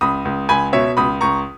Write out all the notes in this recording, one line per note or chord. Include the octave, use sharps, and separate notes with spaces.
C#2 B5 D#6
C#2
C#2 G#5 B5
B2 C#5 E5
C#2 B5 D#6
C#2 A#5 C#6